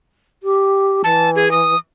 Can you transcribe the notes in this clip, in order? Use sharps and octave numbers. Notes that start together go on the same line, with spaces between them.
G4
E3 A5
G#4
D#6